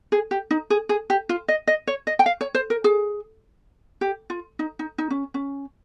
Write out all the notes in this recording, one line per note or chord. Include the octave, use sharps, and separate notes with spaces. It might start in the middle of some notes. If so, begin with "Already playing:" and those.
G#4
G4
D#4
G#4
G#4
G4
F4
D#5
D#5
C#5
D#5
G5
F5
C#5
C5
A#4
G#4
G4
F4
D#4
D#4
D#4
C#4
C#4